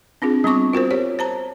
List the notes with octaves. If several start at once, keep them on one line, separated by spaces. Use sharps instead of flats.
C4 D4 F4 G#4
G3 B3 C4 C#6 D6
F4 F#4 A#4 C5
G4 C5 C#5
C5 A5 A#5